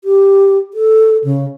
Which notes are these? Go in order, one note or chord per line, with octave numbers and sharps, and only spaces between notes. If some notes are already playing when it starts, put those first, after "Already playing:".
G4
A4
C#3